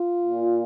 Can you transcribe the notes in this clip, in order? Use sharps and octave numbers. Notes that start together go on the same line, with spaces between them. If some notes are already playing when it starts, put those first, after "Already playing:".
Already playing: F4
A#2